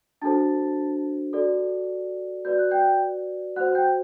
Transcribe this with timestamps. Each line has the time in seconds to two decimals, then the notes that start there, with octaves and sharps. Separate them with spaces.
0.22 D4 F#4 A4 C5 A5 A6
1.33 F#4 A4 D5
2.45 F#4 B4 D5 G6
2.58 F#6
2.71 G5 G6
3.56 F#4 C5 F#5 F#6
3.75 G5 G6